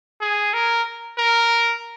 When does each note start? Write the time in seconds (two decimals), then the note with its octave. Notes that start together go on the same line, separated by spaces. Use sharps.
0.21 G#4
0.53 A#4
1.18 A#4